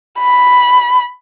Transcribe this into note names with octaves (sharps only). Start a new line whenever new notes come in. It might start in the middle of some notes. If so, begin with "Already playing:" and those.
B5